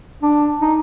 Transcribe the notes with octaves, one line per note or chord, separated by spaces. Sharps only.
D4
D#4